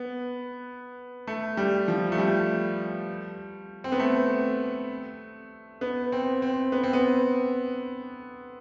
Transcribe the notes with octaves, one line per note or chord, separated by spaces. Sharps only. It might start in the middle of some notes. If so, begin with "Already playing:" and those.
Already playing: B3
A3
G3
F3
A3
G3
C4
B3
A3
B3
C4
C4
B3
C4
B3